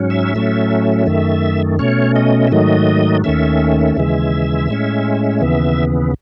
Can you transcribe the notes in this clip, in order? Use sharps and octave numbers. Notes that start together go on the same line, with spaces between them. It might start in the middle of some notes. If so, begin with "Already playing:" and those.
Already playing: G#2 F#3 C#4
E5
A2 F#3 A3 C#4
F#2 D#3 A3
B2 A3 C#4 C#5
D#5
E5
G#2 D#3 F#3 A3 D#5
D#2 D#3 A3 C#4 E5
D#2 C#3 E3 G#3
A2 G#3 C#4
D#2 C#3 E3 B3